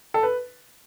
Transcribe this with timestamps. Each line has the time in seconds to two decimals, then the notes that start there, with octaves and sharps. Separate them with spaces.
0.14 A4
0.23 B4